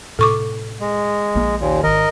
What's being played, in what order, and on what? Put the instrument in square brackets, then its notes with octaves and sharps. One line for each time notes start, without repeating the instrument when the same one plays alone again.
[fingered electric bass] A2 C3 [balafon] A4 C#6 D6
[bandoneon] G#3
[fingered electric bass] A#1 A#3
[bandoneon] D#2 A#2
[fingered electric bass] G#1 D#3 [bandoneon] A#4 D#5